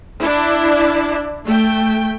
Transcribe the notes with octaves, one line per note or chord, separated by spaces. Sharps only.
D4 E4
A3 G5